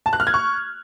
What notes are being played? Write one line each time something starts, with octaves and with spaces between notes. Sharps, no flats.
A5
F#6
F6
G#6
C#6